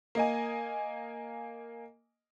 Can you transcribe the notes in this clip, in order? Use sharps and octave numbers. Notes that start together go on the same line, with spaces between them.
A#3 D#5 G#5